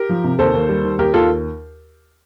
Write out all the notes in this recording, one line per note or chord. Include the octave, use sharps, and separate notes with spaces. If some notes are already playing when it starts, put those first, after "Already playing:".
Already playing: G4 A#4
F3
C3
D#2 A4 C5
D#2
G3
D#3
D#2 G4 A#4
D#2 F4 A4